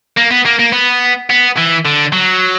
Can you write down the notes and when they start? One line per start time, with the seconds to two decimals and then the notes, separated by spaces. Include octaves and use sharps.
0.17 A#3
0.30 B3
0.46 A#3
0.59 A#3
0.72 B3
1.30 B3
1.57 E3
1.85 D3
2.12 F#3